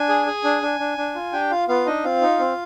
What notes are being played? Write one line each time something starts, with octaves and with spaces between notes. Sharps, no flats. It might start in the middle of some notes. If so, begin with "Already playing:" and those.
Already playing: D4 G#5
G#4
G#4
D4
D4
D4
D4
F4
D4 G4 G5
F4 F5
B3 F4 F5
D4 D#4 D#5
C4 F4 F5
D#4
C4